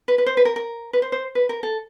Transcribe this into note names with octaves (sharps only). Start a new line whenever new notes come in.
B4
B4
C5
B4
A#4
A#4
B4
C5
C5
B4
A#4
A4